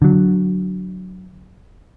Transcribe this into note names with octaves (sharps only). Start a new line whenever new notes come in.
D3 F#3